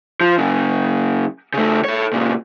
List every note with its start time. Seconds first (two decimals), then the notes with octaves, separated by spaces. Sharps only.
0.21 F3
0.38 F#2 C#3
1.54 C#3 A3
1.84 A4 C#5
2.13 A#2 C#3